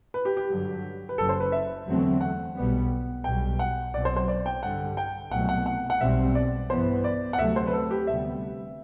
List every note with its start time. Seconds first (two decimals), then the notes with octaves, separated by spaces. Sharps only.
0.14 B4
0.25 G4
0.37 G4
0.49 G2 D3 F#3
1.09 B4
1.17 F#1 F#2 F#3 A4
1.29 C5
1.40 B4
1.52 E5
1.87 E2 D3 F#3 A3 C4
2.21 F#5
2.56 B1 B2 G3 B3
3.24 B1 B2 G3 G5
3.59 F#5
3.93 B1 B2 F#3 C4 D5
4.05 C5
4.16 C5
4.28 D5
4.46 G5
4.62 G2 D3 G3 F#5
4.97 G5
5.31 C2 B2 F#3 A3 F#5
5.49 F#5
5.66 F#5
5.90 F#5
6.00 B1 B2 G3 C4 E5
6.35 D5
6.70 G2 E3 B3 C5
7.04 D5
7.33 F#5
7.38 D2 C3 F#3 A3 E5
7.56 C5
7.67 B4
7.73 A4
7.91 G4
8.07 D2 C3 G3 B3 E5